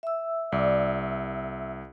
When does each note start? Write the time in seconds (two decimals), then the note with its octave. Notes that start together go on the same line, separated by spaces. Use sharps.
0.03 E5 E6
0.52 C2 D5